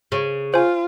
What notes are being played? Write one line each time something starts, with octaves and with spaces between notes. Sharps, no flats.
C#3
F4 C5 G#5